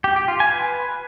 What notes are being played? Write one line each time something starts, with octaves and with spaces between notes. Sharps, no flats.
G4
G4
F4
G#5
B4